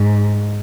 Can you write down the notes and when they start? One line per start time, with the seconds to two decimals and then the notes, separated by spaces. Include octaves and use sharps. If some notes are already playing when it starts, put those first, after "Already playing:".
Already playing: G#2